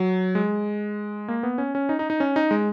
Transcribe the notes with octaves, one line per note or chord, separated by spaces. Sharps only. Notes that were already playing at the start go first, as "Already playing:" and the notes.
Already playing: F#3
G#3
A#3
B3
C#4
C#4
D#4
D#4
D#4
C#4
D#4
G#3